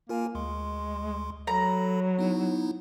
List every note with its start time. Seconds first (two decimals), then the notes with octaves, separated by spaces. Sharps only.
0.09 A#3 F4 A#4 G#5
0.35 D2 G#3 C6
1.47 F#3 A4 A#5 B5
2.19 B3 D#4 E4